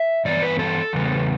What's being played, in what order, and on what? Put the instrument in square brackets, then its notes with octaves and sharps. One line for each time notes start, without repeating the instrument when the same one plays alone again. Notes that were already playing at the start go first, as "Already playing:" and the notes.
Already playing: [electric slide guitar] E5
G2 E3 B3 D5
B4
A4
E2 C#3 G3 B3